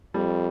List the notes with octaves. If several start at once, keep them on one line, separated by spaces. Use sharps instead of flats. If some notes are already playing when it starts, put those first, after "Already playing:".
F2 G3